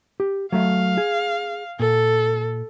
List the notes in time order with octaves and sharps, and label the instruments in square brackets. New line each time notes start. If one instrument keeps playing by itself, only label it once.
[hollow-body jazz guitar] G4
[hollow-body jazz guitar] F#3 A3 E5 [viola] F5
[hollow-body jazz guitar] G#4
[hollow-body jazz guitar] A#2 [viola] A4